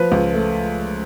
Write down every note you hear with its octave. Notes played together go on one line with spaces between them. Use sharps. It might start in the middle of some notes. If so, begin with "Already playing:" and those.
Already playing: F3 B4
C#2
A3